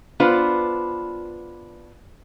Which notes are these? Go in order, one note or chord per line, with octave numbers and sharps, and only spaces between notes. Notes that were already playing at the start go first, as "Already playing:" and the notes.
B3 D4 F4 B4 C5